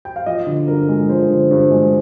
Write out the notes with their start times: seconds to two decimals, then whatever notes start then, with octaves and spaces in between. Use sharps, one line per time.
0.05 G5
0.16 F5
0.26 F3 D#5
0.47 D3
0.68 G2 A#4
0.89 G#3
1.09 F3 C5
1.30 D3
1.51 G2
1.71 G#3